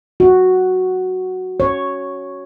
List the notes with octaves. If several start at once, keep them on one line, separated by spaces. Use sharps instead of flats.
F#4
C#5